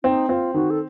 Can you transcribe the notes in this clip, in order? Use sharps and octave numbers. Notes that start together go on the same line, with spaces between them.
C4 D#4
C4 F4
D#3 F#4
A4